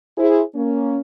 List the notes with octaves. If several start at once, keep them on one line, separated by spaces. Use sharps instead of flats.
E4 G#4 C5
A#3 C#4